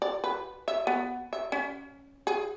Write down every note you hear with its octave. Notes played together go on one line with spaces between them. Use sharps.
D5
B4
E5
B3
E5
C#4
G#4